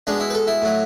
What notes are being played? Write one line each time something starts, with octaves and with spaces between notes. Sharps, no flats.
B2 G#3 D4
E4
B4
A4
E4
A2 F#3